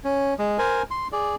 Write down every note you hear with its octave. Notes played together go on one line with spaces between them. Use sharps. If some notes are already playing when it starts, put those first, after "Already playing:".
C#4
G#3
A#4 C5 G#5
C6
G#4 D5